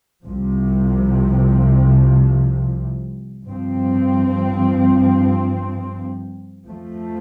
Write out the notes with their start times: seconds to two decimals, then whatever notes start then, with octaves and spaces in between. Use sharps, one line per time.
0.24 C2 C3 F3
3.44 G2 F3 C4
6.66 F2 F3 A3